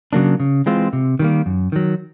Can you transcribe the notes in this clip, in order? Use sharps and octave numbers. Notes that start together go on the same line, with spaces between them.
C#3 F#3 A#3 D4
C#3
E3 G#3 C4 F4
C3
D#3 G3 A#3
F#2
D#3 F#3